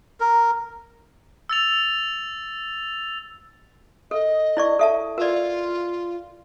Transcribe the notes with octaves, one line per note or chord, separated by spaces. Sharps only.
A#4
E6 A6 F7
A4 D#5
E4 D5 C#6
A4 E5 A5
F4 A#4 D5